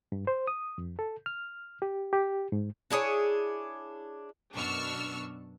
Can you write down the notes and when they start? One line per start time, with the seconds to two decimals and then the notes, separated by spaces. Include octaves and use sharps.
0.12 G2
0.27 C5
0.47 D#6
0.78 F2
0.99 A4
1.26 F6
1.82 G4
2.13 G4
2.52 G#2
2.90 D4 E4 G#4 C#5
4.54 F#2 B2 D4 C#6 E6 F6